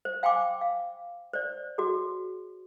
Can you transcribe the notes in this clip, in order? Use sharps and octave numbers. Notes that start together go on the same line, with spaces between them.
C5
F5 G5 G#5 C6 D6
F5
C5 D5
F#4 G#4